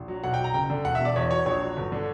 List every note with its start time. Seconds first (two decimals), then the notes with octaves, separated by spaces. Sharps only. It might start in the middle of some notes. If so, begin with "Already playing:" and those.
Already playing: A#1
0.08 F#3
0.24 B1 F#5
0.34 G5
0.39 F#3 A#5
0.54 F#1 G5
0.70 D3
0.85 E1 F#5
0.95 B2 E5
1.05 D5
1.16 E2 C#5
1.31 F#3 C#5
1.46 A#1 C#5
1.61 F#3
1.77 G1
1.92 D3